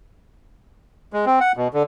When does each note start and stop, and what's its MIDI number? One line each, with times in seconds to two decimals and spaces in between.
1.13 1.25 56
1.26 1.39 60
1.41 1.52 78
1.57 1.68 47
1.74 1.83 50